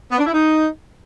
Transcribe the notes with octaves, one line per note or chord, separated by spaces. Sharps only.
B3
D4
E4
D#4